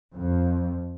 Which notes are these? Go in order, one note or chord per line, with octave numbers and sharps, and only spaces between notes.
F2